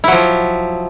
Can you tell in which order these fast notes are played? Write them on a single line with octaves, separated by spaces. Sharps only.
E4 F#3 F3